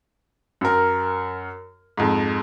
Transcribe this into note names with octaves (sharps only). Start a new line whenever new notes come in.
F#2 A#4
F2 G#2